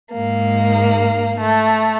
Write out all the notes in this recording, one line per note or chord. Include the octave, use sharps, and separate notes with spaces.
G#2 A#3
A3